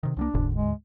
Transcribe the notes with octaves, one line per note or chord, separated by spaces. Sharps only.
C3 D#3
C2 F3 A#3 D4
F1 D2 G#2 D3
G#3